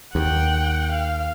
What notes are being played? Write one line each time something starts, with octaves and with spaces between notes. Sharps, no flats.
D#2 F#5 G5
F5